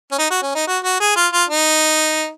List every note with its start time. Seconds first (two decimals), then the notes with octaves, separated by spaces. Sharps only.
0.12 C#4
0.19 D#4
0.31 F#4
0.42 C#4
0.55 D#4
0.67 F#4
0.84 F#4
1.00 G#4
1.16 F4
1.33 F4
1.49 D#4